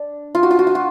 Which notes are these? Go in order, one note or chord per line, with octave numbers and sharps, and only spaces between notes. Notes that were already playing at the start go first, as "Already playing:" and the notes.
Already playing: D4
F4
F#4
F4
F#4
F4
F#4